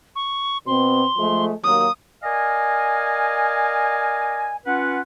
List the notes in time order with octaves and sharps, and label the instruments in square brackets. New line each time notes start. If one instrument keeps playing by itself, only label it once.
[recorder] C#6
[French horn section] B2 C4 [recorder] C6
[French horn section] F3 G#3 A3
[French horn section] D#2 F#3 A#3 [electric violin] D#6
[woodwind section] A#4 D5 D#5 F5 G#5
C#4 F4 B4 F#5